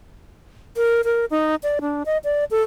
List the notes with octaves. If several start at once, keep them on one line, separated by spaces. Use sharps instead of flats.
A#4
A#4
D#4
D5
D4
D#5
D5
A4